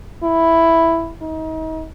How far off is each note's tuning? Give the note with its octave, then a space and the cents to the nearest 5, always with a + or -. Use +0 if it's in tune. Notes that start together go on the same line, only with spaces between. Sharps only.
E4 +0
D#4 +35